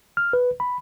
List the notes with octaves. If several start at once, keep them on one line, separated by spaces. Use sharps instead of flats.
F6
B4
B5